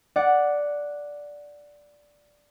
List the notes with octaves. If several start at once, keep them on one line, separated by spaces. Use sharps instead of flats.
D5 F#5